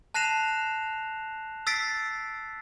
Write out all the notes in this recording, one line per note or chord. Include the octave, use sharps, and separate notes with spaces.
A5 F#6 A#6 C7 E7 F7
E6 A6 B6 C7 D7